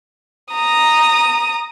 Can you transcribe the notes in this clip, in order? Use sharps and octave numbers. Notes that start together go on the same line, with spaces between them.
A#5 D#6